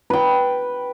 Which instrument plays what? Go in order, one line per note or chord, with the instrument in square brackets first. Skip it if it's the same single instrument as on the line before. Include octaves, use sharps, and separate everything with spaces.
[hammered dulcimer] B4 G5